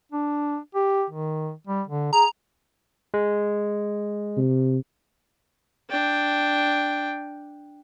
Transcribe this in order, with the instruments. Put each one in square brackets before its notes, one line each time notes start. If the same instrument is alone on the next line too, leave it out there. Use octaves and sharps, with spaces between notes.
[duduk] D4
G4
D#3
G3
D3
[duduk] G#4 [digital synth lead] A#5
[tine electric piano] G#3
[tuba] C3
[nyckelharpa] D4 G5